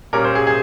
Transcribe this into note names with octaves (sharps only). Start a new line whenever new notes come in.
A#2 G3 C#4 A#4
C5
G#4
G#4